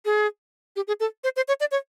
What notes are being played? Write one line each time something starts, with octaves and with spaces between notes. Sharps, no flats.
G#4
G4
G#4
A4
C5
C5
C#5
D5
C#5